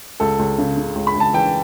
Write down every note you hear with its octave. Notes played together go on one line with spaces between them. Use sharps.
C#2 A4
C#2
C#3
C#3
C#2
B5
C#2
A5
E3 G5